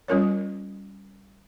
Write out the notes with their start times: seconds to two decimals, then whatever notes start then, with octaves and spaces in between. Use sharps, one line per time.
0.08 G3 C#4 F4 A#4 C#5